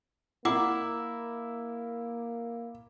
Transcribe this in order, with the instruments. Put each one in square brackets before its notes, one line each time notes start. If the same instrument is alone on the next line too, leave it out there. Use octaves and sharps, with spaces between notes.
[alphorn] A#3 [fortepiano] E4 [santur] A#4 D5 [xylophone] F#5 D6